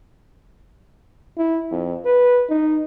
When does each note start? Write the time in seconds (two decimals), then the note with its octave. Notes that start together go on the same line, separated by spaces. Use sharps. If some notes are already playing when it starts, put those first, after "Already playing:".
1.38 E4
1.72 F2
2.05 B4
2.50 D#4